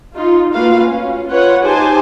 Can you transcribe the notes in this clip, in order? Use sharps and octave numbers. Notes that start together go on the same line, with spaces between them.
D#4 F4
A3 A#3 F4 F#4 B4 F5
C#4
F4 B4 C#5 F#5
D#4 G4 C5 G#5 A5